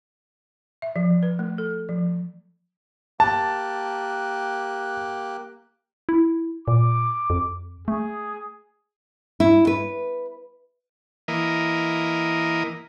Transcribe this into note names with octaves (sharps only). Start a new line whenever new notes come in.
E5
F3
F3
B4
A3
A4
F3
A#3 G4 A5 F#6
E4
A#2 D6
F2
A3 G#4
E4
B4
E3 A#3 D#5